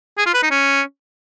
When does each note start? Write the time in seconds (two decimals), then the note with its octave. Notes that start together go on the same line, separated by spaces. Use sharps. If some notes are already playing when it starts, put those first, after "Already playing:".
0.18 G#4
0.26 F4
0.34 B4
0.43 D#4
0.51 C#4